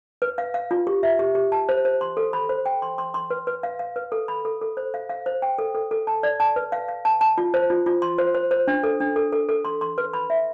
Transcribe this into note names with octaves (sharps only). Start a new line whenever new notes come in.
B4
F5
F5
F4
G4
E5
G4
G4
A5
C5
C5
C6
A4
B5
C5
G5
C6
C6
C6
B4
B4
F5
F5
B4
A4
B5
A4
A4
C5
F5
F5
C5
G5
A4
A4
A4
A5
D5
A5
B4
F5
F5
A5
A5
F4
C5
F4
F4
C6
C5
C5
C5
D4
A4
D4
A4
A4
A4
C6
C6
B4
B5
E5